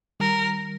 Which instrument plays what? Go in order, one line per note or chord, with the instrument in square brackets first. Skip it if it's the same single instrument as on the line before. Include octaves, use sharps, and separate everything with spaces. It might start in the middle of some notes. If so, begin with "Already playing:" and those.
[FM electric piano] D#3 G3 [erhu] A#4